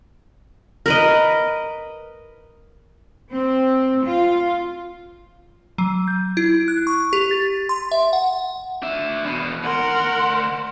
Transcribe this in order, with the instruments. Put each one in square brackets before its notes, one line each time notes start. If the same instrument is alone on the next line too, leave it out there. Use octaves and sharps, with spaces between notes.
[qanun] A#4 B4 D#5
[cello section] C4
F4
[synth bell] F#3
G6
E4
F#6
C#6
G4
A6
C6
E5
F#5
[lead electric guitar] D4 E5
E2 B2
[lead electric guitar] D2 C6 [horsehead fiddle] A#4 F#5